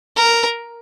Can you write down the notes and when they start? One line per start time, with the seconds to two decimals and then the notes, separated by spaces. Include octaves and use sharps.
0.16 A#4